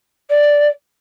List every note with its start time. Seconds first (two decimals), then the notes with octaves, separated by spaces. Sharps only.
0.30 D5